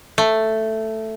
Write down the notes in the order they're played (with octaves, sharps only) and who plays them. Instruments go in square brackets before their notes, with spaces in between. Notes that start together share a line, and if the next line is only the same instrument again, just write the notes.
[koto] A3